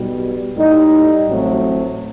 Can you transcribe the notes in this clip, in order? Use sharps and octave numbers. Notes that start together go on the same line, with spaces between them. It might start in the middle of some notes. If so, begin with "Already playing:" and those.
Already playing: B1 B2 G3
A2 G3 D#4
A1 A2 F#3 A3 C4